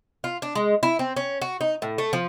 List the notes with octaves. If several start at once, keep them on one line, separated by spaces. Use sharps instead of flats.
F4
D4
G#3
E4
C4
C#4
F#4
D#4
A2
A3
F3